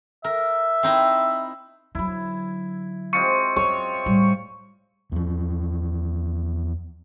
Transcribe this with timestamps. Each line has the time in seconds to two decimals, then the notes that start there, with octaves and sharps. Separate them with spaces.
0.24 A#4 E5
0.83 C4 D#4 E4
1.95 D3 F#3 E4
3.13 G#3 C4 F4 C#6 C#7
3.56 F#2 C#5
4.06 A2 G3
5.12 E2 F3